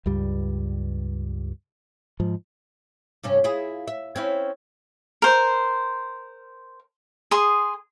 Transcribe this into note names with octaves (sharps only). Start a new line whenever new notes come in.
C#2 G2 G3
G#2 F3
G2 C3 C#4
E4 F4 G#4
E5
C4 C#4 E4
A#4 C5
G#4 C6 D#6